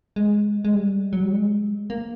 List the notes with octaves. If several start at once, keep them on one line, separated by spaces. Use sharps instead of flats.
G#3
G#3
G3
F#3
G3
G#3
A#3